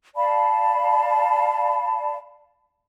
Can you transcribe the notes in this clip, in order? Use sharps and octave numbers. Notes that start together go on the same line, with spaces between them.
D5 F5 A5 B5